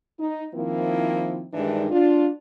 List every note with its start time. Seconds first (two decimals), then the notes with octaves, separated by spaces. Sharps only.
0.19 D#4
0.54 D#3 F3 A#3 C4 E4
1.54 G2 D#3 E3 G#3 D4 D#4
1.90 D4 F4